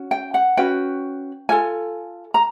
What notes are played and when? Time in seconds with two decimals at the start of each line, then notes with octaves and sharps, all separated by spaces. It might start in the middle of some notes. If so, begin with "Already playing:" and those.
Already playing: C#4 F#4
0.11 G5
0.34 F#5
0.57 C#4 F#4 B4 G5
1.49 F4 A4 G#5
2.34 A#5